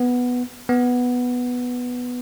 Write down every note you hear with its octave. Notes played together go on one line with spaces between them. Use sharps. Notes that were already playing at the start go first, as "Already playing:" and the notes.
Already playing: B3
B3